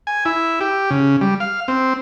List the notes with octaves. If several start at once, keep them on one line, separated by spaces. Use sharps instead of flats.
G#5
E4
G4
C#3
G3
F5
C4